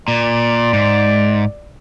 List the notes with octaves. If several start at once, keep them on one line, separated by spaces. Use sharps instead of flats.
A#2 D5
G#2